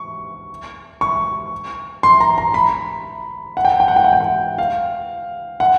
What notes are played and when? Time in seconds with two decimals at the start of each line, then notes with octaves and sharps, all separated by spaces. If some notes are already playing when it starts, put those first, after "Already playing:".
Already playing: C#6
1.01 C#6
2.03 C6
2.20 A#5
2.38 A#5
2.54 B5
3.57 F#5
3.65 G5
3.72 F#5
3.80 G5
3.88 F#5
3.96 G5
4.04 F#5
4.13 G5
4.20 F#5
4.58 F5
5.60 F#5